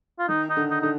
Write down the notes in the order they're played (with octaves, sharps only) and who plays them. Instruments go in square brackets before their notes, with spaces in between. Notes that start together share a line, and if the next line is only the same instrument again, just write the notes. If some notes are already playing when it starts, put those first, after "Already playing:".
[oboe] F4
[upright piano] D#3 [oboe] D#4
[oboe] D#4
[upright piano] D3
[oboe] D#4
[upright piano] D3 [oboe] D#4